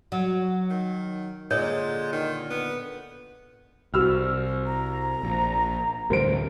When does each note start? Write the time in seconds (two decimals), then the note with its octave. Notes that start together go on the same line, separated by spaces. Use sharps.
0.12 F#3
0.70 D#3
1.51 A#2 D3 G#3 C#5
2.13 D#3
2.50 B3
3.94 C2 F#4 E6 F6
4.66 A#5
5.23 A#1
6.10 A1 D2 G2 A#4 C5 D7